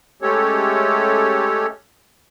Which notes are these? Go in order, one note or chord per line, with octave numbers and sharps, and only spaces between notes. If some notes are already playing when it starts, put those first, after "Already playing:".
G#3 A3 C#4 G4 A4 C#5